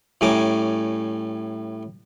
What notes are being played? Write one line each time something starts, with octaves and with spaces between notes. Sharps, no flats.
A2 G3 C#4 G#5 A#5 D6